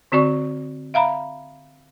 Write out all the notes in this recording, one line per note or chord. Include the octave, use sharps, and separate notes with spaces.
D3 C4 F#4 D5 C#6
E5 F5 A#5 B5